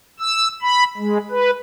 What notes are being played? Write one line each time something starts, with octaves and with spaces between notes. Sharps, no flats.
E6
B5
G#3
B4